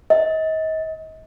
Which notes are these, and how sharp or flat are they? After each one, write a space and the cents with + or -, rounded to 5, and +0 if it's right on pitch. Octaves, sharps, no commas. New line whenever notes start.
D#5 +35